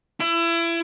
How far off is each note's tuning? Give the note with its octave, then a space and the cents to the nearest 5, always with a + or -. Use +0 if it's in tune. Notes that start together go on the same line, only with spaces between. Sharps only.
E4 +30